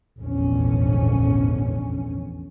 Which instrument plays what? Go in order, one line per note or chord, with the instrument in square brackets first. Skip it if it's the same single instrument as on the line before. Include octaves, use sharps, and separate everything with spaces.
[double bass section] F1 A#1 E2 G#2 D3 C#4